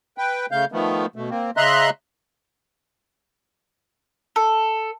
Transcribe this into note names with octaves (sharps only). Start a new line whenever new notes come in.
B4 G5
C#3 A3 F5 G6
D#3 F3 A3 B3
B2 A3
A#3 C4
C#3 D#5 E5 A#5 C6 F#6
A4